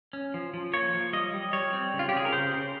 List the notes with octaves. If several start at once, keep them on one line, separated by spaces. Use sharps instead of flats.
C#4
F3
F3
A#3 C#5
F3
G3 D#5
G3
G3 C#5
C4
C#3
F4
G4
C#3 G#4
A#4
C#3 C5
C#3